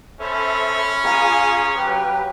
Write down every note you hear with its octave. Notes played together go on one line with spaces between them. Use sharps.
C#4 A4 C5 E5 B5
F4 G#4 F5 G#5 A#5 D#6
F#3 G4 B4 G5